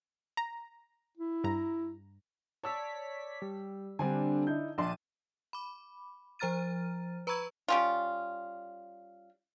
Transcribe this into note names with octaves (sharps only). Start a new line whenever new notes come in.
A#5
E4
G2 A#5
C#5 D5 A5 E6 B6
G3
D3 G3 C4 D4 G#5
D#4 E4 G6
A#1 D4 A5 C6 D#7
B5 D6
F3 C5 A#5 F6 A6 D#7
B4 A#5 B5 C#6 E6 G#6
G3 C#4 F4